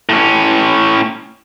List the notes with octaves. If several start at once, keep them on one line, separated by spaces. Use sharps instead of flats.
A2 C#4